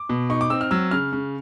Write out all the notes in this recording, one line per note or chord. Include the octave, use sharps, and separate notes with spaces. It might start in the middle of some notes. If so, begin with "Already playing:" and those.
Already playing: D6
B2
D#4 C#6
D6
C4 E6
F6
F#3 E6
C#3 F6
C#3